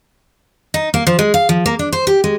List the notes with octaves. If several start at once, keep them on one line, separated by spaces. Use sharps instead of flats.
D#4
A#3
F3
G#3
F5
F3
A#3
D4
C5
G4
G#3